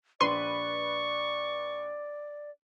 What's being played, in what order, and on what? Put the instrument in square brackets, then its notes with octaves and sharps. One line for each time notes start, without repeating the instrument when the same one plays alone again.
[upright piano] A#1 B4 D#7 [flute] D5 [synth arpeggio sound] C6 [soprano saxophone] C#6